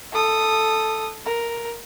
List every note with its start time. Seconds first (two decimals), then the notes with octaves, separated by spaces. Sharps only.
0.12 A4 D#6
1.25 A#4